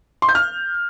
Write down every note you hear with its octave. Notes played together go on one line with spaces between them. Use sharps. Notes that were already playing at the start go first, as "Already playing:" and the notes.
C6
G6
F6